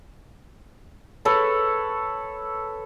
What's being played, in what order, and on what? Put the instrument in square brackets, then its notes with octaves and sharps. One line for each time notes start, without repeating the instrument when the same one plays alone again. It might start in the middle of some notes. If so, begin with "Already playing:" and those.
[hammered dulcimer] A4 B4 C#5